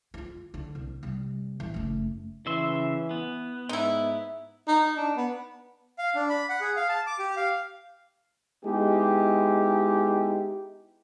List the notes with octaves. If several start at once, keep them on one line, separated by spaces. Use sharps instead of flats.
D#4 F4
D3
C2
C3 G3
A#2 E3
F#1 A3
C#3 E3 E5 C6
B3
G#2 D#4 E4
D#4
D4
B3
F5
D4
B5
F#5
G#4
F5
A5
D6
G4
F5
G#3 B3 D#4 E4 G4